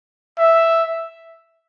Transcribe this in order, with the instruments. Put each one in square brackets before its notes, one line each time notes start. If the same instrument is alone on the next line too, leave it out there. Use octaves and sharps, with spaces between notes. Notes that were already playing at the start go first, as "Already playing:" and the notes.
[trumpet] E5